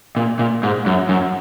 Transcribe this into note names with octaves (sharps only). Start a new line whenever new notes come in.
A#2
A#2
G#2
F#2
F#2